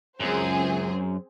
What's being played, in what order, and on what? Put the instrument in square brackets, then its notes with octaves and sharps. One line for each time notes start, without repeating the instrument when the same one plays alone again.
[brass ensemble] C#2 [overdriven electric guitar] F#2 [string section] C4 G#4 C5